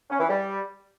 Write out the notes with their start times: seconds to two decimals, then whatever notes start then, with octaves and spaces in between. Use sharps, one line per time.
0.09 C#4
0.19 E3
0.28 G3